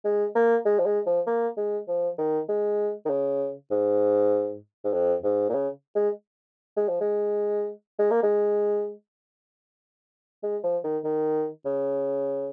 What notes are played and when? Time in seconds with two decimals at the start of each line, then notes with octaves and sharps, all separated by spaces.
0.05 G#3
0.35 A#3
0.65 G#3
0.79 F3
0.86 G#3
1.06 F3
1.27 A#3
1.57 G#3
1.88 F3
2.18 D#3
2.49 G#3
3.05 D#3
3.10 C#3
3.71 G#2
4.84 G#2
4.93 F2
5.24 G#2
5.49 A#2
5.54 C#3
5.95 G#3
6.77 G#3
6.89 F3
7.01 G#3
7.99 G#3
8.11 A#3
8.23 G#3
10.43 G#3
10.63 F3
10.84 D#3
11.04 D#3
11.65 C#3